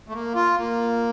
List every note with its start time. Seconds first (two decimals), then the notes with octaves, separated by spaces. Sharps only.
0.08 A3
0.13 A#3
0.35 F4
0.57 A#3